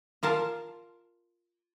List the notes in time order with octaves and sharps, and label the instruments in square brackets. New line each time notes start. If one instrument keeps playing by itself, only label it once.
[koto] F4 A#4 F5 A5